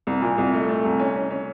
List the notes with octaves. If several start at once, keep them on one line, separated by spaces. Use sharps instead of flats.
C2
A#2
C2
A3
A3
C2
C#4
C#4
C#4